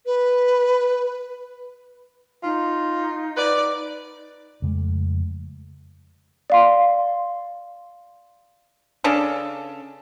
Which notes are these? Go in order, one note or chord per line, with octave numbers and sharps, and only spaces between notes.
B4
D#4 F4
B4 D5
F2 C#3 G#3 A3
D5 F5 C6
C#3 C#4 D4 A4